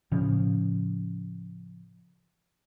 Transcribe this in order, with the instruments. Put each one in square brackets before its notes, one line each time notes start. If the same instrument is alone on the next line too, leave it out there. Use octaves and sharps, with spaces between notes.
[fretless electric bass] A2 C#3 F3 C#4